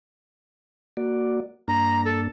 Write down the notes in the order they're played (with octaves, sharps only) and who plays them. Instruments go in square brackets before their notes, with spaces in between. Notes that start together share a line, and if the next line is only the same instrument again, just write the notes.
[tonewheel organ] A#3 F#4 D5
[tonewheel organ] G2 A#3 D4 [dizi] A#5
[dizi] A4